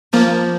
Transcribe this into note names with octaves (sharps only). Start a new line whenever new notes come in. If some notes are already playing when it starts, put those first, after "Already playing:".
F3 A#3